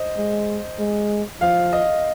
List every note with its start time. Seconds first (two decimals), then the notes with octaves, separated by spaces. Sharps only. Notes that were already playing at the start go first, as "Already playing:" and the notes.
Already playing: C5 D#5
0.17 G#3
0.79 G#3
1.41 F3 F5
1.73 D#5